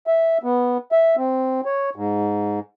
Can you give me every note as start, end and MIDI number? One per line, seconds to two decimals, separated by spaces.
0.07 0.38 76
0.43 0.78 59
0.92 1.16 76
1.17 1.61 60
1.66 1.90 73
1.96 2.59 44